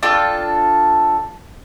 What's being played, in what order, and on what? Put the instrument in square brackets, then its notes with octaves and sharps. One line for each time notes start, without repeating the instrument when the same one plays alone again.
[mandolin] D4 F4 A4 G5